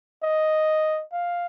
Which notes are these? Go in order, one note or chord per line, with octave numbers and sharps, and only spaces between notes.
D#5
F5